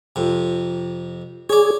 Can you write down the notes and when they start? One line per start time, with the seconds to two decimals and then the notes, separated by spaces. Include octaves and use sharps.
0.16 F2 C3
1.49 G#4 C#5 D5